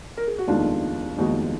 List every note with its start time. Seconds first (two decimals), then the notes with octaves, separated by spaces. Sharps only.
0.17 A#4
0.27 G#4
0.38 F#4
0.47 F1 D#2 D#3 G#3 B3 D4 F4
1.18 F1 D#2 D#3 G#3 B3 D#4 F#4